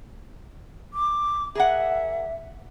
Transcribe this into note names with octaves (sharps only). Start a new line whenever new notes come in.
D6
G#4 A#4 E5 F#5